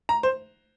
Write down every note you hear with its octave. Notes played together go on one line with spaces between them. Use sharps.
A#5
C5